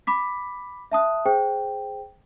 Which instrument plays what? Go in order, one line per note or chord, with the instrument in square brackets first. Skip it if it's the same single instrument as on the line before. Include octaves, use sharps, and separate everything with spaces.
[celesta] B5 D6 B6
E5 A5 D#6 F#6
G#4 C5 G5